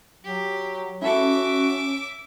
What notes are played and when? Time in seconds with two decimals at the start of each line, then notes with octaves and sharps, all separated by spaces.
0.24 F#3 G4
1.02 C#4 E4 F#4 A4 E5 D6